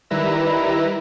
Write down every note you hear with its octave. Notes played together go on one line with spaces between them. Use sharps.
D#3 G3 E4 B4 A#5 E6